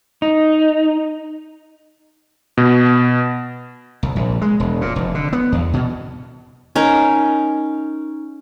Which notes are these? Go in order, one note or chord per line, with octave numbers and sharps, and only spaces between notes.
D#4
B2
C2
A#1
G#3
E1
A#2
F1
D3
B3
E2
B2
C#4 D#4 A#4